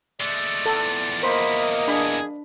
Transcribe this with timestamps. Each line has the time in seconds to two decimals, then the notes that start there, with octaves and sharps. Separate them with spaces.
0.20 G#3 A3 D5
0.66 E2 F3 A4
1.23 A#3 C5 D#5 B5
1.88 D4 G#4 B5